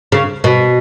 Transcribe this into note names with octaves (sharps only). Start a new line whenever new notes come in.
C#3
B2